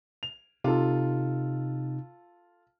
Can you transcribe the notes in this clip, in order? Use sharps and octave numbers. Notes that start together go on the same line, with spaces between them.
F7
C3 D#4 F4 A4